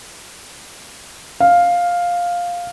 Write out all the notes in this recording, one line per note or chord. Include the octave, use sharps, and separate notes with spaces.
F5